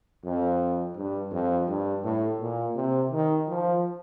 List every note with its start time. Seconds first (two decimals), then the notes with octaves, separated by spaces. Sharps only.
0.24 F2
0.96 G2
1.32 F2
1.68 G2
2.03 A2
2.40 A#2
2.75 C3
3.11 D#3
3.48 F3